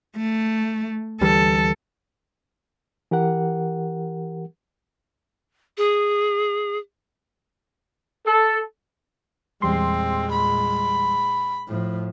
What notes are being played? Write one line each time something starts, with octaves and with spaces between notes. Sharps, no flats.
A3
D2 E3 G3 A4
E3 G4 A#4 F#5
G#4
A4
E2 A#2 G3 G#3 C4 C6
B5
A2 F3